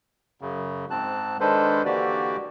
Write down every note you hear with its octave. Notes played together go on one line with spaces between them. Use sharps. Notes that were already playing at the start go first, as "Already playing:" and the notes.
F#2 C#3
G#2 C4 A5 F#6
D#3 G#3 D4 A4 B4 C5
D3 E3 A#3 F#4 G4 D5